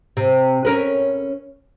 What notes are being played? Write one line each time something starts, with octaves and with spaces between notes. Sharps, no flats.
C3
C#4 A#4 B4